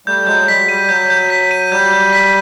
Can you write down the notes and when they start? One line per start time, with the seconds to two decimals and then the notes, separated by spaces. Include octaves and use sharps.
0.06 G3 A3 G6
0.27 F#3 G#3 G6
0.48 G3 B6
0.68 G3 D#7
0.89 F#3 G6
1.10 G6
1.30 B6
1.51 D#7
1.72 G3 G6
1.93 G6
2.13 B6